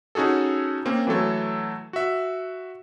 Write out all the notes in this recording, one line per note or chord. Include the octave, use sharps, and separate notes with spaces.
C#4 D#4 F#4 G#4 A4
A#3 C4 C#4
E3 F#3 A3 A4 C#5
F#4 E5